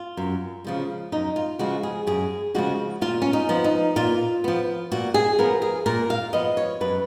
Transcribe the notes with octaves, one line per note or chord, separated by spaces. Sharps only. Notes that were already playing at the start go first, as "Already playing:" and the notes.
Already playing: F4
F#2
C#3 F3 G#3
F#2 D#4
F4
C#3 F3 G#3 F#4
G#4
F#2 G#4
C#3 F3 G#3 F#4
A#2 F4
C#4
D#4
F3 B3
D#4
A#2 F4
F3 B3
A#2 F#4
G#4
F3 B3 A#4
G#4
A#2 A#4
F5
F3 B3 D#5
C#5
F#2 B4